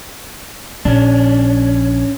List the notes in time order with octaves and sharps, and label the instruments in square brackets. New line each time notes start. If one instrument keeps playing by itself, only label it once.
[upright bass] A#1 [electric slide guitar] C#4 D4